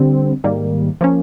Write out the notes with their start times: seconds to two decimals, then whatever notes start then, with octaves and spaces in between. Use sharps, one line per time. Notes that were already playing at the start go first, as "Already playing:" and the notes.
Already playing: D3 G3 C4
0.44 G#2 D#3 G3 A#3
1.01 F3 A#3 C#4